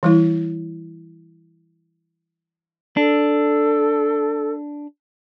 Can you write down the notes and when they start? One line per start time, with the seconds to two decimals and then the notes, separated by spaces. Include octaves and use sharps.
0.03 E3 G3 E4
2.97 D4 A4